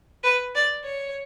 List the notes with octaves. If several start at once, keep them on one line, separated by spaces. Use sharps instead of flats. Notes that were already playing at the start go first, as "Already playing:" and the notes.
B4
D5
C#5